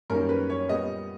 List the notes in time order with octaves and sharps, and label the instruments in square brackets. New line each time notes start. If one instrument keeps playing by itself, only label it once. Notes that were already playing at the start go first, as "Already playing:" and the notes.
[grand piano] F#2 D#3 G3 A#3 C#4 A#4
B4
C#5
A#2 G3 B3 D#5